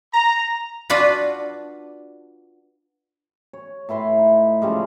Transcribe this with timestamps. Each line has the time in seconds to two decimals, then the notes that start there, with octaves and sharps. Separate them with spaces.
0.14 A#5
0.90 D4 F4 F#4 B4 B5
3.53 C#5
3.89 A2 E4 B4 C6
4.18 D#4
4.62 C#3 F3 G3 G#3